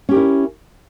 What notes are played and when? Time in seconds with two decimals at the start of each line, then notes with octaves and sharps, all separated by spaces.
0.09 C#4
0.11 G4
0.14 A#4
0.16 E4